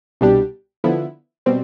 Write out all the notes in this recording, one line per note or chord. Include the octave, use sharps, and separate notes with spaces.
C2 B2 G3 D4 G4
D3 F3 B3 E4
B2 G3 C4